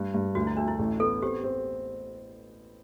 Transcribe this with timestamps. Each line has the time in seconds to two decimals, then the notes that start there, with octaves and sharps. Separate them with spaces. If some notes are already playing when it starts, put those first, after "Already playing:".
Already playing: G2
0.14 G2
0.35 D2 F#4
0.47 E4
0.57 A3 D4
0.68 E4
0.79 A1
1.00 B3 A4
1.22 C4 G4
1.44 C4